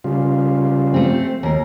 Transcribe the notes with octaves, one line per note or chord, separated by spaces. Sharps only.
C#3 G3 F4
A3 C4
D#2 A#4